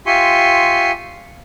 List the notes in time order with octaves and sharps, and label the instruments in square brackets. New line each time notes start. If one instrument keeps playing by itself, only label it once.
[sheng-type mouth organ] F4 G4 E5 G#5 C6 C#6